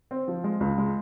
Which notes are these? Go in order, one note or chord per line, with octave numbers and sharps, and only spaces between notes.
C4
F3
G#3
C#2
G#3